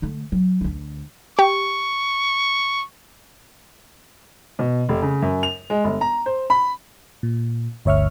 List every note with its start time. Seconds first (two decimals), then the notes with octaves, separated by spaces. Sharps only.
0.02 D3 A3
0.32 F#3
0.61 D2 D4
1.39 G4 C#6
4.59 B2
4.89 F1
5.02 C#3
5.22 F#2
5.43 F7
5.70 G#3
5.84 G1
6.01 A#5
6.26 C5
6.50 B5
7.23 A#2
7.85 G1 D2 C#5 E5 C#6 F6